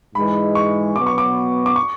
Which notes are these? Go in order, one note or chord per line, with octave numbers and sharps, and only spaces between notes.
G#2 E3 G#3 B5
C#6
B2 F#3 B3 D6
C#6
D6
D6
C#6